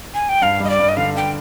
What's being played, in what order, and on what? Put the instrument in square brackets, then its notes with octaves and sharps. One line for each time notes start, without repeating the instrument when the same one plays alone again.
[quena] G#5
G5
[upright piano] G2 [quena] F5
[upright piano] G3 [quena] D#5
[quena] D5
[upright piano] G2
[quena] D#5
[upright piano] D3 [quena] F5
[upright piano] G2 [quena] G5